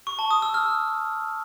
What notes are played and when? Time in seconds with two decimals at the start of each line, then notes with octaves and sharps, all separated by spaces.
0.07 C#6
0.19 A5
0.31 D#6
0.42 E6
0.54 F6